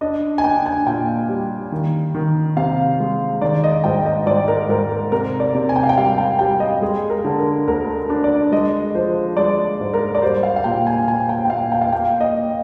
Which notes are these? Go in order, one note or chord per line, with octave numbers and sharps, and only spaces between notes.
D4 D#5
G#5
D4 G5
G#5
A#2 G5
G3
D#3
D#3
C3 F5
G#3
D#3 D5
D#5
G#2 G5
D#5
G#2 D5
A#4
G#2 A#4
A#4
C3 A#4
D5
C3
G#5
G5
F5
G5
G3 F5
G5
G3 G5
D#5
G#3 G#4
A#4
D3
A#4
D2 A#4
D4
D5
G#3 D#5
F3 C5
G#3 D5
G#2
A#4
D5
G3 C5
F5
F5
A#2 G5
G#5
A#2 G#5
G5
G5
A#2 F5
G5
F5
A#3 G5
D#5
A#3